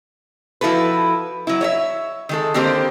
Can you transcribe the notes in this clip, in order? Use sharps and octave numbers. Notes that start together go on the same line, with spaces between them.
F3 E4 F#4 A4 B4
F#3 E4
C#5 D#5 E5
D#3 G#3 A4
D3 D#3 A#3 C4 G4 C5